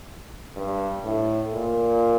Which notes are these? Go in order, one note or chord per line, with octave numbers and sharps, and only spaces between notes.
G2
A2
A#2